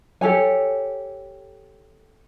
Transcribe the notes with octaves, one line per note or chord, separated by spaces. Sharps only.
G4 A4 C#5 G#5